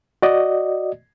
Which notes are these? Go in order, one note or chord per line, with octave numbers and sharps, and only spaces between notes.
F#4 D5 D#5